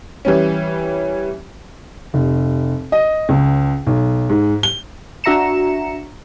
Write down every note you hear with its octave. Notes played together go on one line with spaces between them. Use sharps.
E3 G3 C#4
F1
D#5
C#2
B1
G#2
G7
D4 F#4 E5 A#5 C#7 E7